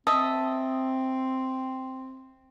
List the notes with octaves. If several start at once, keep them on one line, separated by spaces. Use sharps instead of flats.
C4 D#5 E5 A5